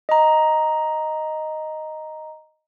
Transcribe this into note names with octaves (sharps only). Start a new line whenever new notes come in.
D#5 A#5